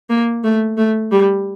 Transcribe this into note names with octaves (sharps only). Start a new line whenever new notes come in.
A#3
A3
A3
G3